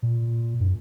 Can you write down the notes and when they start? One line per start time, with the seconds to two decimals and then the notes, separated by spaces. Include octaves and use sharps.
0.02 A#2
0.60 F#2